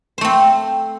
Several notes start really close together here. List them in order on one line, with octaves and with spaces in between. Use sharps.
C5 A3 C4